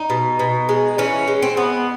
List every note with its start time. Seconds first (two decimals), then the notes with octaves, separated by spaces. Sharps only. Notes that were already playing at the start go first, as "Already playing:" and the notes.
Already playing: D#4
0.10 B2
0.39 B2
0.69 G#3
0.98 E3 C#4
1.28 G#3
1.42 C4
1.57 B3